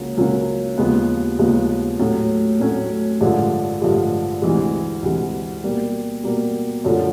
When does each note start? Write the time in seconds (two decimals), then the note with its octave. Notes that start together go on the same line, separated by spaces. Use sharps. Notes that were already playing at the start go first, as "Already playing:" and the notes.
Already playing: C#2 C#3 F#3 A#3 C#4
0.17 C#2 C#3 F#3 A#3 C#4
0.78 D#2 C#3 F3 G#3 B3
1.39 D#2 C#3 F3 G#3 B3
1.99 A2 F#3 A3 C#4
2.60 A2 F#3 A3 C#4
3.20 A1 G2 D3 F3 G#3
3.81 A1 G2 D3 F3 G#3
4.42 D2 C3 E3 G#3
5.03 D2 C3 E3 G#3
5.63 B2 G3 A#3
6.24 B2 G3 A#3
6.85 F#2 D3 F3 A3